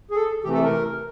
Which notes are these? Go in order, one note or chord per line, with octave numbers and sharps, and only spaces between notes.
G#4
A4
C3 E3 A3 G4
A4
A#4